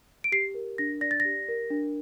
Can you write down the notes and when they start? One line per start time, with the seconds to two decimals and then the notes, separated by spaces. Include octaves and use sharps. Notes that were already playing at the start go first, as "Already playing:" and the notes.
0.24 D7
0.32 G4 C7
0.54 A#4
0.78 D4 A#6
1.01 D5 A#6
1.11 A6
1.20 A#6
1.25 G4
1.48 A#4
1.70 D4